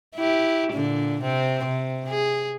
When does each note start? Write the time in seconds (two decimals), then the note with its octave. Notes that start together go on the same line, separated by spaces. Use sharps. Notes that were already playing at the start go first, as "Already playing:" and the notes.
0.16 E4 G4
0.73 A#2 D3
1.21 C3 C4
1.65 C3
2.08 G#4